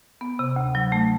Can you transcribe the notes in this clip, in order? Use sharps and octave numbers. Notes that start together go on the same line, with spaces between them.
B3
C3
D2
F#3
A3